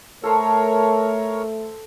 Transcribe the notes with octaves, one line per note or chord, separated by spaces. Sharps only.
A3 A4 A#4 C5 C#5 A5